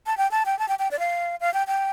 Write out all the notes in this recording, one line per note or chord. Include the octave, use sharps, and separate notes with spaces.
A5
G5
A5
G5
A5
G5
G5
D5
F5
F5
G5
G5